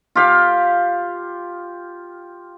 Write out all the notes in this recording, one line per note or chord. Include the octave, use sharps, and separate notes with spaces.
F4 G4 F5